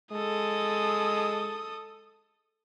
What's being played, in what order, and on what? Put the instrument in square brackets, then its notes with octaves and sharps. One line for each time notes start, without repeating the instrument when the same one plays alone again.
[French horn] G#3 [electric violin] A4 D#6